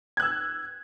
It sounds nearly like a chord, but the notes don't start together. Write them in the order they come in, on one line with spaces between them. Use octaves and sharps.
G#6 F#6 E6